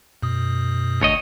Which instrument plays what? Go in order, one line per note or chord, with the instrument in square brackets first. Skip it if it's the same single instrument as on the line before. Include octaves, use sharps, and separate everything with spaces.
[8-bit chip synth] F#2 B2 D#6
[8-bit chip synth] G#1 [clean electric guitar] D2 C#5 D#5